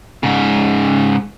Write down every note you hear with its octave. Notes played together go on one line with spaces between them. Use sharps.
G#2 C#3